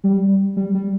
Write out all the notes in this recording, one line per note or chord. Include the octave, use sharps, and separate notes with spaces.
G3
G3
G3